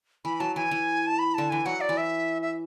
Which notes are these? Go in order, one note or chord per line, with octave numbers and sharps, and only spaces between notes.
E3 B5
F#3 A5
E3 G#5
E3
A5
B5
D3 A5
E3 G#5
F#3 F#5
D5
E3
E5
E5